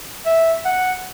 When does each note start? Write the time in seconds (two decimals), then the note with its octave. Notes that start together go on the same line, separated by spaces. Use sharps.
0.26 E5
0.65 F#5